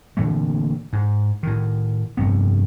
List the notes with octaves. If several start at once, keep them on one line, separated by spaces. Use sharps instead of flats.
A#2 D3 E3 A3
G#2
A2 D#3
F1 G2 B3